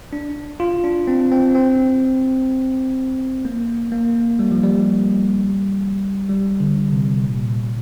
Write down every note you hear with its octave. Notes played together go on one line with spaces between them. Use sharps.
D4
F4
D4
C4
C4
C4
A#3
A#3
G3
F3
G3
G3
D3
C3
A#2